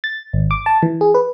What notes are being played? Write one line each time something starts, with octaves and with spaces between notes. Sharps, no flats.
A6
G#1
D6
A5
E3
G#4
B4